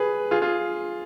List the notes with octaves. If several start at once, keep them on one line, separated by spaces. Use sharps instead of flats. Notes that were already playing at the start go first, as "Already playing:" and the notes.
Already playing: G#4 B4
F4 G#4
F4 G#4